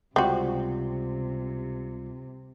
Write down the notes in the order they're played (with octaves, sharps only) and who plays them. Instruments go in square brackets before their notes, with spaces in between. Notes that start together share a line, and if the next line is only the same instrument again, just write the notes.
[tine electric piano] C#2 G3 F4 [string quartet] C3 [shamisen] C4 F#4